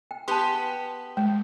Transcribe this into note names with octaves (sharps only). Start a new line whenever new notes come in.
G5
B3 G4 B4 A5 C6
G#3